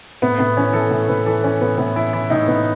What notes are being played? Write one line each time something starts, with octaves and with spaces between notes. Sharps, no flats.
A2 B3
A2 B3
E3 C#4
E3 A4
A2
A2 B4
E3 A4
E3 C#4
A2 B3
A2 B3
E3 E4
E3 E4
A2 D#4
A2 B3